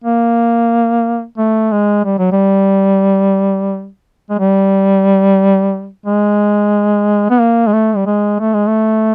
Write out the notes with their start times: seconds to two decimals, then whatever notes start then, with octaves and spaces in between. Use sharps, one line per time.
0.04 A#3
1.38 A3
1.71 G#3
2.05 G3
2.19 F#3
2.32 G3
4.30 G#3
4.39 G3
6.06 G#3
7.30 B3
7.40 A#3
7.67 G#3
7.73 A3
7.96 G3
8.07 G#3
8.40 A3
8.53 G#3
8.68 A3